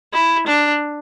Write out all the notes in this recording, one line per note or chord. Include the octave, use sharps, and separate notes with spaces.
E4
D4